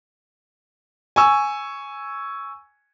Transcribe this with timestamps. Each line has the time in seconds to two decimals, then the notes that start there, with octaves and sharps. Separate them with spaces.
1.16 G#5 C#6 E6